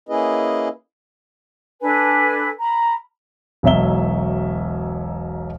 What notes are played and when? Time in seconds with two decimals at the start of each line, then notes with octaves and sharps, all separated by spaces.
0.09 A#3 C#4 E4 G#4 B4 D#5
1.82 D4 A4 B4 G#5
2.59 A#5 B5
3.63 E1 B1 F#3 E5 G7